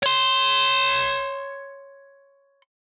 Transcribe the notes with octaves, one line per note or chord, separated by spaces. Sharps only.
C#5 C6